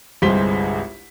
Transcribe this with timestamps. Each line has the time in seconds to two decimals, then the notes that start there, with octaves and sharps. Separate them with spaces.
0.22 G1 C2 G#3 C5 B6 G7